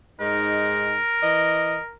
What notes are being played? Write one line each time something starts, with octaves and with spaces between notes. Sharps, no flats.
G#2 G#3 D#4 A#4
E3 D#5